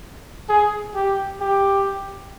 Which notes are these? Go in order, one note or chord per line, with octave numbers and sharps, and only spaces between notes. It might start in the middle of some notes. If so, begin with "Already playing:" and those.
G#4
G4
G4